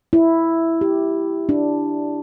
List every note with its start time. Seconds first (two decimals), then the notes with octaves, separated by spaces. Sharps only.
0.13 E4
0.81 G4
1.49 D4